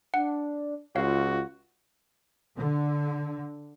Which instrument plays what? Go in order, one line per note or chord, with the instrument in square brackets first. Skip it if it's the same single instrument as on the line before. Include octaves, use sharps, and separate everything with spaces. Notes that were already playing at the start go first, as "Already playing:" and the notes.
[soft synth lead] D4 [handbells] F#5
[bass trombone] C#2 [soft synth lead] F4 [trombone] F#4 [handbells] C#5 F5
[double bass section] D3